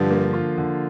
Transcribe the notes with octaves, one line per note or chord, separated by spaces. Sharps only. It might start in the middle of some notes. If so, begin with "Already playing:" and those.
Already playing: G2 D3 F3 F4
A#3
F4
D3